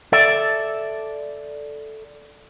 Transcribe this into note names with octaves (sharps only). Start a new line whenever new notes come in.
A4 D5 E5